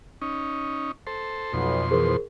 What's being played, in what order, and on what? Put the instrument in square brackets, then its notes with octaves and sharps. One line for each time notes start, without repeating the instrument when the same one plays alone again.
[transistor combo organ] C#4 D#4
A4 C5
[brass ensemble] B1 [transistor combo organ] F2 B2 C6
[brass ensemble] E3 C5 [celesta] G#4 A#4